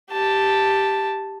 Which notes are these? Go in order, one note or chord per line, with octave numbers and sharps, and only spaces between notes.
G4 A5